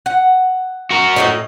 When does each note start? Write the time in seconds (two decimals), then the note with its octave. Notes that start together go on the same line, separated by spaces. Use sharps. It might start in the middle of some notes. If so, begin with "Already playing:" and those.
0.06 F#5
0.91 F#4 A#4
1.16 A2 C3 D#5